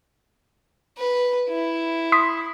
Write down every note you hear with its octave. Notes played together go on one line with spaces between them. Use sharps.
B4
E4
C6 D#6 B6